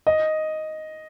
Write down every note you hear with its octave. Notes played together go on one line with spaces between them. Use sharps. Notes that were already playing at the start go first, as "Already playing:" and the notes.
D#5